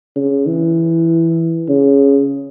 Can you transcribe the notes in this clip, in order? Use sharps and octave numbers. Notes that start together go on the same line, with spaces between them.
C#3
E3
C#3